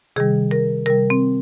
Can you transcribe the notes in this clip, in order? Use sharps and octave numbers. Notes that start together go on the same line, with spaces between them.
C3 D#3 G3 G#4
A#4
C3 G3 A#4
C4